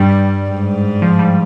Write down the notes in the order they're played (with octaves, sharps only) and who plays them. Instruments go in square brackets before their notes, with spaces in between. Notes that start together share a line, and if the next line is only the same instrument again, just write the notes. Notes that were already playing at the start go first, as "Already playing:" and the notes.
Already playing: [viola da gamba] G2 [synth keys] G3
[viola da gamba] G#2
[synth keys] F3
G3